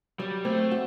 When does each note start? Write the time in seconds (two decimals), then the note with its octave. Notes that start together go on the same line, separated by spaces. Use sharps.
0.19 F#3 G3
0.45 A3 C4
0.71 F#4